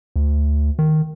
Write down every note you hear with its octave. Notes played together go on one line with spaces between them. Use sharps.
D2
D#3